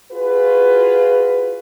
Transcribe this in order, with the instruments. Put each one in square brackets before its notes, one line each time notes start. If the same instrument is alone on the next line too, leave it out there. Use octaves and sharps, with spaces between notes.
[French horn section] F4 F#4 G#4 B4